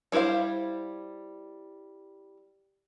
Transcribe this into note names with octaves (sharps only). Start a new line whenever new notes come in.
G3 E4 B4 C5 F5